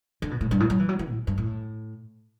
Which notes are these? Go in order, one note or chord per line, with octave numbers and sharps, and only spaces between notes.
D3
B2
A2
G2
A2
F#3
E3
F#3
E3
A2
G2
A2